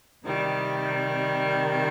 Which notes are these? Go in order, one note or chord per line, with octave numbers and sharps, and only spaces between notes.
C3 D#3 G3